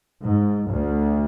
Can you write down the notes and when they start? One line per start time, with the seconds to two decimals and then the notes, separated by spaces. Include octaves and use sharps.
0.23 G#2
0.69 D2